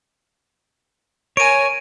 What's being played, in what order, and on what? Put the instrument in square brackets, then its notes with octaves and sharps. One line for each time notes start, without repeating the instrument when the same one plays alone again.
[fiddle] A#4 G#5 [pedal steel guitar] C#5 [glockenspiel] D7 D#7